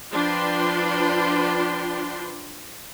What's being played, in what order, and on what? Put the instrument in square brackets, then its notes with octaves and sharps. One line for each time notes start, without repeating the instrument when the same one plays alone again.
[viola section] F3 D4 F4 B4 G5 C6